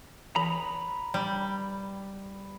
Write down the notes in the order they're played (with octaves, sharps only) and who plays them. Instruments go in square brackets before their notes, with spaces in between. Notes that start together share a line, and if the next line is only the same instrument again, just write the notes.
[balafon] E3 [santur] B4 [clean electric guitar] A#5 B5
[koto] G3